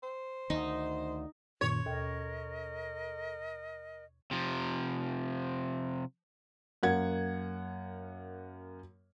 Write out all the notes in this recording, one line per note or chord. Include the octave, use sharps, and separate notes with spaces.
C5
D2 D#3 D#4
F#2 A#2 D#3 C#5
D#2 B2 A4 A#4 D#5 G5
C3 F3
F#2 A#3 F#5 G#6